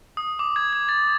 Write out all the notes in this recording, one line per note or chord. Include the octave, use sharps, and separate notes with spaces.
D#6
D6
G#6
G#6
A6